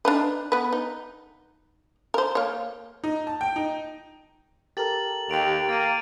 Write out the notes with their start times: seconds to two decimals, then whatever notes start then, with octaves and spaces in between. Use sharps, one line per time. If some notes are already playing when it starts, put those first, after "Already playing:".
0.05 D4 D#4 B4
0.52 B3 B4
0.73 D#4
2.14 A#4 C5
2.35 A#3 C#5
3.04 D#4
3.27 A5
3.41 G5
3.56 D#4
4.77 G4 A4 A#4 A6 F#7
5.30 D#2 G5 D7 F7
5.69 A#3 A6 D7 D#7